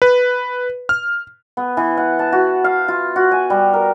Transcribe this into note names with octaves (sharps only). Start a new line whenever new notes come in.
B4
F6
B3
E3
F#5
A5
F#4
F5
F4
F#4
G#5
G3
A#4